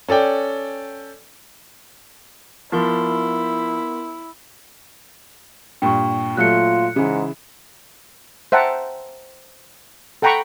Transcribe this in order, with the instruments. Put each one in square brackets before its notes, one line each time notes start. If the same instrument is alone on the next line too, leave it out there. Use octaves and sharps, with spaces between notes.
[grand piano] C#4 A4 D5 G5
[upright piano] F3 [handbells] B3 A#4 C6 [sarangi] E4
[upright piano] G2 A#2 [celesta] G5 C#6
[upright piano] A#2 F#3 A3 [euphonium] F4 [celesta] F#6 C#7
[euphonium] G#2 [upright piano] C#3 E3
[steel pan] C5 E5 F#5 G5 A5 A#5
A4 F#5 G5 A#5 B5 C#6